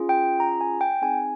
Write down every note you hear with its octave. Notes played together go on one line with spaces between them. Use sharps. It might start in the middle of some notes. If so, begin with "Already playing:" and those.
Already playing: C#4 F4 G#4
G5
A#5
G#5
G5
C4 D#4 G#4 G#5